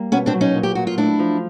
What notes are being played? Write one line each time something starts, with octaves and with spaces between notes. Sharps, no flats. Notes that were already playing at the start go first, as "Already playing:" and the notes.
Already playing: G3 A#3
B2 B3 C#4
C4 D4
F#3
C#4 D#4
A#2
G4
A#2 F#4
F4
A3 D4 E4
F3